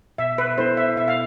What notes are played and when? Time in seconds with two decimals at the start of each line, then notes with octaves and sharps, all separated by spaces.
0.18 B2 E5
0.38 B4
0.58 B3 E4 A4 C5
0.77 E5
0.96 B2 E5
1.08 F5